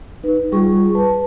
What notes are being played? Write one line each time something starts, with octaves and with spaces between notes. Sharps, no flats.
D#4 B4
G3 F4 G#4 C#6
B4 A5